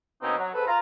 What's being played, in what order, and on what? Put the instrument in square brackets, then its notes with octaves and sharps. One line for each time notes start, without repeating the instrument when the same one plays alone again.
[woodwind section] B2 A#3 C4 C#4 D#4
F#3
G#2 A4 B4
F4 A#5